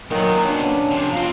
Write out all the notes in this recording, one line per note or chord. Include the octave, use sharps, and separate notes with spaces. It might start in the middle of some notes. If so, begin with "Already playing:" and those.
A#2 D#3 F#3 B3
C#4 D4
C3 F3
B2 C4 F4